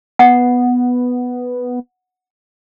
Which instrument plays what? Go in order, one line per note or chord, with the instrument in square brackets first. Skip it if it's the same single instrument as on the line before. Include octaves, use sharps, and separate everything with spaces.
[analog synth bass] B3 [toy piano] F#5